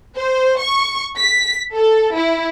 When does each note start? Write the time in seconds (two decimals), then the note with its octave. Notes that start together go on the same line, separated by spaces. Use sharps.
0.17 C5
0.61 C#6
1.17 B6
1.75 A4
2.16 E4